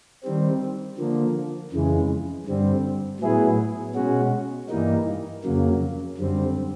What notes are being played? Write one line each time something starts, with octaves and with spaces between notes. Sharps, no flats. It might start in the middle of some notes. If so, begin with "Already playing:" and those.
D#3 G3 C4
D3 F3 A#3
F2 C#3 E3 G#3
G2 D3 G3 C4
A2 F#3 B3 E4 G#4
B2 G#3 C#4 F#4
G2 E3 G3 A#3 D#4
F2 C#3 F#3 A#3
F#2 D3 G3 C4